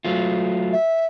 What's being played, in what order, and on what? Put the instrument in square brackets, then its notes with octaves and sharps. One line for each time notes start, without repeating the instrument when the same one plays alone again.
[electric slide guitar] F#3 A3 F4
[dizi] E5